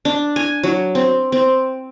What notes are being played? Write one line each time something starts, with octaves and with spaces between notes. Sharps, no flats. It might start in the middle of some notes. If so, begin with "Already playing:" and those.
D4
G#5
F#3
C4
C4